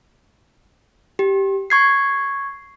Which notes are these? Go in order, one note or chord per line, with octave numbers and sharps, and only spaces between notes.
G4
C#6 G#6 C7